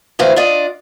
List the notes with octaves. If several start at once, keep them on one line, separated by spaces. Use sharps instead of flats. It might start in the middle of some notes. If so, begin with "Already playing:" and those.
D2 A2 E3 C5 F5
D4 F4 D5 D#5